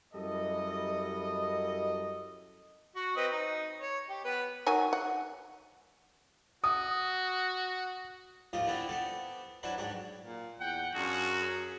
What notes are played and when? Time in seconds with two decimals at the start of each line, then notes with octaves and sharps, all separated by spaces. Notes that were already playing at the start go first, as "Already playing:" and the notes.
0.15 F#2 G3 E4 A4 D#5
2.96 F#4
3.17 C4 B4 D#5
3.32 D#4
3.81 C#5
4.09 G4
4.24 B3 B4
4.66 D#3 F#3 G#5
4.93 F#5
6.64 F#4 D#6
8.53 D#2 A2 F3 F4 G4 D#6
8.66 D3 A3 B3 C4 D4 E4
8.89 B3 C4 G4 A4
9.63 F#3 D4 E4 B4 C5
9.78 G#2 F#3 D4 G4
10.21 A#2
10.59 E2 F#5 G5
10.94 F#2 D4 F4 F#4 G#4
11.39 C#4 G#4